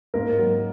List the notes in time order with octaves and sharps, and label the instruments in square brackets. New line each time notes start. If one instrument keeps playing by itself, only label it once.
[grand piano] G#2 A#3 A#4
F#3